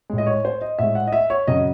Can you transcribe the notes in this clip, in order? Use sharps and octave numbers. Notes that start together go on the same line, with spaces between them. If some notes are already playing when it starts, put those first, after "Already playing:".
A2 G#3
D#5
C#5
C5
D#5
A2 G#3 E5
F#5
D#5
E5
C#5
F#2 C#3 F#3 D#5